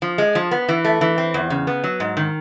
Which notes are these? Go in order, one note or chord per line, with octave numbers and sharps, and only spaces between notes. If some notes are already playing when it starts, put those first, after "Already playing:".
F3
G#3
F3
B3
E3
A3
E3
C4
E2
C#3
B3
F#3
G#2
D#3